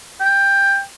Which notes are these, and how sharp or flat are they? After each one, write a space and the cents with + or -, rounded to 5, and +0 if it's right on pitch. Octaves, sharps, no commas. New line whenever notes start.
G5 +15